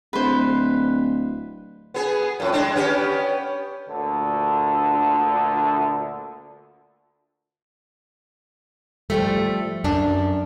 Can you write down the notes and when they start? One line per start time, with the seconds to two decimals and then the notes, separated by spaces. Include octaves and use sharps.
0.13 D1 B4 C5
1.94 B3 G#4
2.40 F2 A2
2.53 G#3 D4
2.75 B3 C#4 G4
3.90 D2 A#2 D3
9.10 F3 G3 A3
9.84 F#2 D4